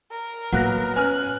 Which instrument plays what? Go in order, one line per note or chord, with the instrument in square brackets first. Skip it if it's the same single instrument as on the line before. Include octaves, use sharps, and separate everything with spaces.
[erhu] A#4
[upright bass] A2 [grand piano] F#3 A#3 B3 [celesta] F#5 F#6 A#6
[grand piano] C#4 G#5 [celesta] B4 F6 [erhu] F#6